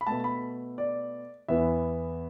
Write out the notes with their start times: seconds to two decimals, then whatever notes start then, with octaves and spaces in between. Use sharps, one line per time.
0.01 B5
0.07 B2 A3 A5
0.24 B5
0.78 D5
1.48 E2 E3 B3 E5